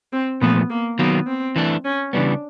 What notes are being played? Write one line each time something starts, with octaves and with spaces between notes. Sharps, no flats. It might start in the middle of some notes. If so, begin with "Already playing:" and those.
C4
A#2 F3 A3 B3
A#3
D#3 F#3 A#3 B3
C4
E3 A3 D4
C#4
C#3 E3 G3 B3 D4